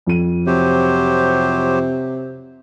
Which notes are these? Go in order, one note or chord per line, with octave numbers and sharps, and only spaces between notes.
F2 D#7
C3 F#3 G4 C5